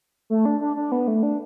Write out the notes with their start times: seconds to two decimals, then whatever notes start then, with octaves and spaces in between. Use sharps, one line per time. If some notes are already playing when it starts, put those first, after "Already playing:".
0.30 A3
0.45 D4
0.61 D4
0.76 D4
0.92 B3
1.08 A3
1.23 D4